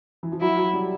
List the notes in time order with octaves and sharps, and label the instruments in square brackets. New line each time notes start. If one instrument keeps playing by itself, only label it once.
[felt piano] E3
F3
[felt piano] F#3 [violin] E4
[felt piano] F#3
G3